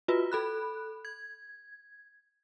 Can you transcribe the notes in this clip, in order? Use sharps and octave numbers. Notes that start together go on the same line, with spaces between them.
F4 F#4 B4
A4 B5 F#6
G#6